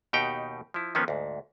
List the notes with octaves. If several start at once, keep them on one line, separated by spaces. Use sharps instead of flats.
D#2 B2 D#4 G4 F#5 G5
F3 E4
D#3 F3 A#3 B3 C#4
D2 G#2